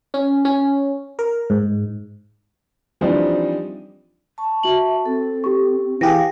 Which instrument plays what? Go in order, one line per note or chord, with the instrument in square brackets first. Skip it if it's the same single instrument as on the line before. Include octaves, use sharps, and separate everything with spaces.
[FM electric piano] C#4
C#4
A#4
G#2
[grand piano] E3 F3 G3 C4 D4 D#4
[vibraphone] A5 C#6
[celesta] F#4 F#7 [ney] E5
[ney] C4 [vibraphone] A4
[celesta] G4 C#6
[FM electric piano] E3 G4 G#4 [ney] F5 [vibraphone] G5 [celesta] A#6